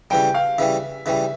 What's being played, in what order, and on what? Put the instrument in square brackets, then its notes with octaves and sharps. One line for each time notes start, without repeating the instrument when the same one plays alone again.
[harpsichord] C#3 E3 G3 [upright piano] G5
[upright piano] F5
[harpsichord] C#3 E3 G3 [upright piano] E5
[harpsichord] C#3 E3 G3 [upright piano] E5